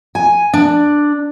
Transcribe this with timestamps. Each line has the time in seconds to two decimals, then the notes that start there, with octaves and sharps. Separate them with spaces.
0.15 G#5
0.53 D4